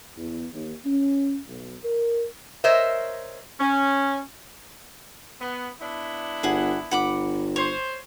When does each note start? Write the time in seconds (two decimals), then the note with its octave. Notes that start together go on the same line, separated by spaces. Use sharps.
0.16 E2
0.53 D#2
0.85 C#4
1.48 B1
1.84 A#4
2.64 A#4 C5 C#5 D#5 E5
3.60 C#4
5.40 B3
5.80 B3 D4 E4
6.43 G1 G#4 F#5
6.91 G1 F#5 B5 D6
7.56 C5 C#5